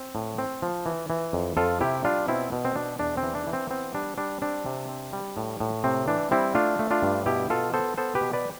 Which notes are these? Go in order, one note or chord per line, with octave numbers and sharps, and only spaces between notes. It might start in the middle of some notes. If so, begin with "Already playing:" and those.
Already playing: C4
A2
C4
F3
E3
E3
F2
F2 F4 A4
C3 E4 G4
G3 D4 F4
B2 C4 E4
B2
C4
B2 D4
E2 D4
C4
E3
D4
E3
C4
B3 C4
G3 D4
G3 D4
C4 D4
C3
C4
G3
A2
A2
C3 C4
E3 D4
G3 C4 E4
A3 D4 F4
A3
D4 F4
G2
B2 E4 G4
B2 F4 A4
B3 A4 C5
B3 A4 C5
G4 B4
B2
B4 D5